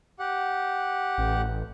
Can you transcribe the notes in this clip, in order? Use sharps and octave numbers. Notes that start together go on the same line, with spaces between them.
G4 F#5
A1